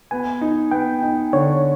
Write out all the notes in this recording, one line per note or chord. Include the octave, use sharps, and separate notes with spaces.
B3 G#5
D#4
B3 G5
D#4
D3 C#5